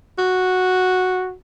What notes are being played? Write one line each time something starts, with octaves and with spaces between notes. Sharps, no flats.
F#4